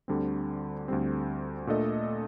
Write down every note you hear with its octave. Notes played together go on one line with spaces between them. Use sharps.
D2 D3 G3 C4
D2 D3 G3 C4
A#2 A3 D4 A4 D#5